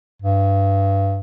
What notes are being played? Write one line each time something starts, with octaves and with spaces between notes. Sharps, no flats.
G2